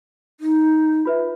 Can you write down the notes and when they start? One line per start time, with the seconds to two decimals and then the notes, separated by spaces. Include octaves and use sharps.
0.40 D#4
1.05 F4 B4 E5